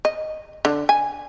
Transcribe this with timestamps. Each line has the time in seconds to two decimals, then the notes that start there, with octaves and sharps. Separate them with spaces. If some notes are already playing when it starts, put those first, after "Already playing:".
0.05 D#5
0.65 D3
0.89 G#5